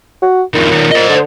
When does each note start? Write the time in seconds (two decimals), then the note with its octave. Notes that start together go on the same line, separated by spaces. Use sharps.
0.22 F#4
0.54 F2 A#2 D#3
0.72 D#3 C#4
0.92 C5 D#5
1.09 D3